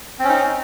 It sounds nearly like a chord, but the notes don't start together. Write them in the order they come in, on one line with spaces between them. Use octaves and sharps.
C4 C#4 D#4